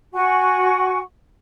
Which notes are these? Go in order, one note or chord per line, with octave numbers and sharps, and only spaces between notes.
F#4 F#5 G#5 C#6